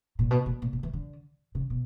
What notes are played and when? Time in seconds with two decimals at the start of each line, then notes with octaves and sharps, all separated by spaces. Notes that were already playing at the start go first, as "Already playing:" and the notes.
0.19 A#2
0.31 B2
0.46 A#2
0.62 A#2
0.73 A#2
0.83 E3
0.93 D3
1.55 C#3
1.70 B2